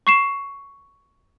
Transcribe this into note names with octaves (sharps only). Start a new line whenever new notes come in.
C#6 C7 E7